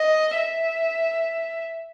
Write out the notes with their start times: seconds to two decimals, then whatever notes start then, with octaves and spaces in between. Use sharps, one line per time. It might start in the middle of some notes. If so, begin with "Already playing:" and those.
Already playing: D#5
0.36 E5